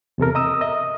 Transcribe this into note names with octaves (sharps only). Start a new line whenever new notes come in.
E2 C3 A4 A#4
D#5 A#5 D#6 E6
D#5 E5